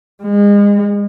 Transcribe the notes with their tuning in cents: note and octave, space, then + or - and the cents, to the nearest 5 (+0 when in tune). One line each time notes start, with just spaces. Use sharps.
G#3 -30